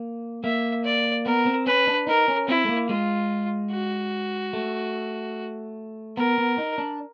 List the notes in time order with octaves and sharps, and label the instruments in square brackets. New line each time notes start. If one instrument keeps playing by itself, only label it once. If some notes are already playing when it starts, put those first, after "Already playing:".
Already playing: [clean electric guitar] A#3
[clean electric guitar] A#3 [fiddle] E5
[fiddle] D5
[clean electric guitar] B3 [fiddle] A#4
[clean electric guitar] C4
[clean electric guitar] C#4 [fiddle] B4
[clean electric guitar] D4
[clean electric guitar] D#4 [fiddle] A#4
[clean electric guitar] C#4
[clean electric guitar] C4 [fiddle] E4
[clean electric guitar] A3
A#3
[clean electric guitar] G#3 [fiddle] F4
[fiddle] F#4
[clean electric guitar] A3
[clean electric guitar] B3 [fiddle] A#4
[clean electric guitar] B3
D#4
D4